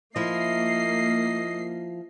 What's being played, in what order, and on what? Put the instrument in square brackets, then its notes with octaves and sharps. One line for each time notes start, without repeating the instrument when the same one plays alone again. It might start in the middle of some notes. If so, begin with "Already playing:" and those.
[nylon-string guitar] F3 E4 [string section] A#3 C7 [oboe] D#5